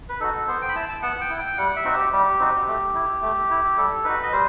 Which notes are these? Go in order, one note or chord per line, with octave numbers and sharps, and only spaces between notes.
B4
D#4 F#4 A4
B3 C5
G5
B5
E4 A5
A5
B3 F#5
G5
E4
G5
G3 F#5
E5
C4 D#4 F#4
G4
G3 G4
C4 D#4 F#4
A3
E4
A3
E4
G3 A4
D#4 F#4 B4
D#5
G3 C5